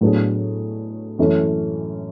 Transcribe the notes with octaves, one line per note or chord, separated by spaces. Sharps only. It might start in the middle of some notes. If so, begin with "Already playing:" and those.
A2 F#3 B3 D4 G#4
F#2 E3 A3 C#4